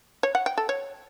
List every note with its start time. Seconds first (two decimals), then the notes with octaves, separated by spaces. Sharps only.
0.23 C#5
0.35 F#5
0.46 G5
0.58 A4
0.69 C#5